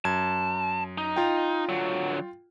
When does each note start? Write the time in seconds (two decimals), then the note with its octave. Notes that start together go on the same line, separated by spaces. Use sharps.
0.05 F#2 A5 G#6
0.98 D#4
1.16 F4 G5
1.69 D3 F#3